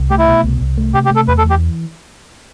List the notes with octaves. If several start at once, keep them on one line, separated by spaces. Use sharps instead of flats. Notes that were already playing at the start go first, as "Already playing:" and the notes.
Already playing: C2
A3 G4
E4
B2
C2
C2
A3
C3 G4
G4
A3
A4
E2 B4
A4
E3
G4